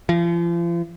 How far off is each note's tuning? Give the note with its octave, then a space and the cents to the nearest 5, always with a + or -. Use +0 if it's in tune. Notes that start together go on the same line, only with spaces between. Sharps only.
F3 -40